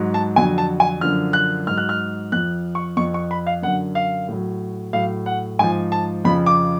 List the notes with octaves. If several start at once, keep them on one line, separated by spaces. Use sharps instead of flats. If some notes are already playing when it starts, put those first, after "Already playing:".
Already playing: G#2 F#3
A5
F2 D3 F#3 G#5
A5
G#5
F#2 D3 F3 F6
F#6
G#2 F#3 F6
F#6
F6
F2 F3 F#6
C#6
F2 F3 C#6
C#6
B5
F5
F#2 D3 F#3 F#5
F5
A2 F#3
A2 F#3 F5
F#5
G#2 F3 G#5
A5
F2 C#3 F3 B5
D6